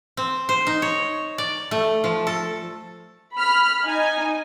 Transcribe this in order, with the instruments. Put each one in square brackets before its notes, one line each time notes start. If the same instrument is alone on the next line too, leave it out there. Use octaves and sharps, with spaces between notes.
[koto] C4
C5
D#4
C#5
D5
A3
F3
A4
[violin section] B5 F6
D#4 G#5